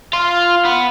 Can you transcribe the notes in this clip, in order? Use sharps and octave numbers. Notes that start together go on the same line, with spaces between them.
F4
B3